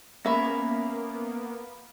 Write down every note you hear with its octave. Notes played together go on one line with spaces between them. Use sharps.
A#3 B3 C#4 E5 B5 A#6